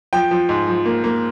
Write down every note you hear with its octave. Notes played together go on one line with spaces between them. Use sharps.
F3 G5
F3
G#2
F3
A#3
A#3